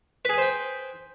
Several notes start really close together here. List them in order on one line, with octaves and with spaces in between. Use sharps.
B4 G#4 G#5 C5 G5